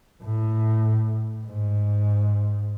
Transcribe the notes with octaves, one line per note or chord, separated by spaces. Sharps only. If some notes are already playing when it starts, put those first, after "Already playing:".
A2
G#2